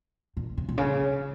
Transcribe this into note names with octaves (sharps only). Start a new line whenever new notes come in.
A#2
C#3
A#2
C#3